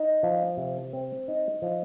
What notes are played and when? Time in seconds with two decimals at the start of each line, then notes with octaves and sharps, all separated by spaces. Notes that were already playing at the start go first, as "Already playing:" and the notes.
Already playing: D#4
0.23 F3
0.57 C3
0.93 C4
1.28 D#4
1.62 F3